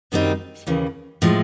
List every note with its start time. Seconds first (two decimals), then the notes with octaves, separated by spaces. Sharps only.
0.12 F#2 D#3 G3 C4 D#4
0.67 D#2 C#3 E3
1.22 A2 F3 G#3